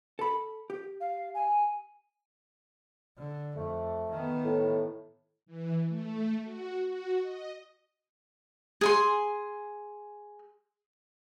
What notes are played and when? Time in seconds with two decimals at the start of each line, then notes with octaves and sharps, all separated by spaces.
0.19 A4 B5
0.70 G4
1.01 F5
1.35 G#5
3.18 D3
3.57 F2 A3
4.10 D#3 B3
4.44 A2
5.46 E3
5.88 A3
6.43 F#4
6.87 F#4
7.21 D#5
8.81 G#4 G#5 C6